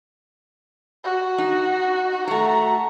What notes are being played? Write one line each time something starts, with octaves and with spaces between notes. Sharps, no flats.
F#4
D#4
A3 F#4 A#5